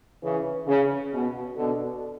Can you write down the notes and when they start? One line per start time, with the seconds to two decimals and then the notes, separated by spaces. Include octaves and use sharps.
0.22 C#3 E3
0.66 C#3
1.11 B2
1.55 B2 D3